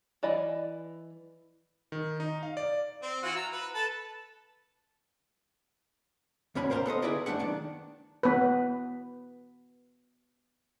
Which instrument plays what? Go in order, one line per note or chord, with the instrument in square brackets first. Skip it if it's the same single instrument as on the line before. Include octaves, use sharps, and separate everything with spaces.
[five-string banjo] E3 D5 D#5 B5
[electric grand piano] D#3
D#4
F5
D5
[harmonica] C4
E3 F4 F#4
A#5 E6
B4
A4 B4 A5
[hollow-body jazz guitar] D2 G#2 B2 C#4 B5
A#4 C5 F5 A5 A#5 C6
B3 A4 C5 D#5
D3 E4 G#4 B4 D5 D#5
F#2 D#3 A3 D4 F#5
D#3 D4
[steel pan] B3 B4